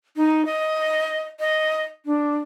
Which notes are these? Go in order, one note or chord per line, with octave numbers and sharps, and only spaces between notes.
D#4
D#5
D#5
D4